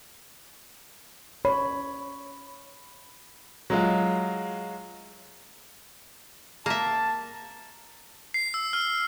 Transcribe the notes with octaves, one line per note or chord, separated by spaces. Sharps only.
C#5 B5
F#3 G#3 F4
A#3 E5 A5
C7
E6
F6